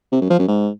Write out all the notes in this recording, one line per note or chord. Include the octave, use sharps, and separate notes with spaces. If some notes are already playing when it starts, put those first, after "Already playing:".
C3
F#2
F3
F#2
G#2